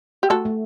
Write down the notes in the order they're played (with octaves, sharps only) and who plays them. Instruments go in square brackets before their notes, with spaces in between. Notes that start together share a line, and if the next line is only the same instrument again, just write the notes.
[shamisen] G4
[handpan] A3 [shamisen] F#4 A4
[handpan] A3